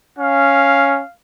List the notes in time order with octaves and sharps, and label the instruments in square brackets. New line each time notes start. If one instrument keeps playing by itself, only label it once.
[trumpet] C#4 [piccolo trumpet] F5